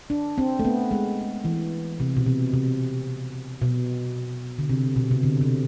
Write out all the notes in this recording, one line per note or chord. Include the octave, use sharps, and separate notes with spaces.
D4
C4
A3
B3
G#3
E3
C3
B2
C3
C3
B2
D3
C3
B2
C3
D3
C3